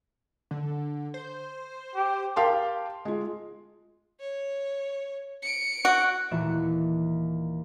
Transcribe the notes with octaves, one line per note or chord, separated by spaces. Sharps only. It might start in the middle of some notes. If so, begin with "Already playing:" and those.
D3
C5
G4
G4 A#4 F5 G5 A5 C6
G#3 F4
C#5
C#7 D7
F#4
D#2 A#2 E3 A3 F#4 E7